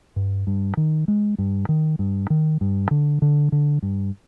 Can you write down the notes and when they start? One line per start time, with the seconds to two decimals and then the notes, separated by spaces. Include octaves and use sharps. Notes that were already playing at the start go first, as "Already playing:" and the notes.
0.16 G2
0.47 G2
0.77 D#3
1.08 G#3
1.38 G2
1.69 D#3
1.99 G2
2.30 D#3
2.61 G2
2.91 D3
3.22 D3
3.52 D3
3.82 G2